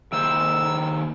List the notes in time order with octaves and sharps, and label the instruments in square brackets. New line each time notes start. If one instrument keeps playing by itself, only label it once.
[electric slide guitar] D#3 A#3 C5 [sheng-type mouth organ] E6